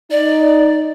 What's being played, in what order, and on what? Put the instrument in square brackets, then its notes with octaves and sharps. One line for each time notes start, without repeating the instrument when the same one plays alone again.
[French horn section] D#4 [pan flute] D5